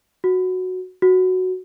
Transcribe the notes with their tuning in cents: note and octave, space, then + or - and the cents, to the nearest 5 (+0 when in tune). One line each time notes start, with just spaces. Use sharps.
F#4 -5
F#4 +0